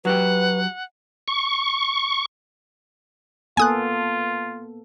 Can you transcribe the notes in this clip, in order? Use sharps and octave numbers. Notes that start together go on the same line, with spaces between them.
F#3 F#4 G4 B4 F#5
C#6
A#3 B3 F4 A4 G#5 D#6 F#6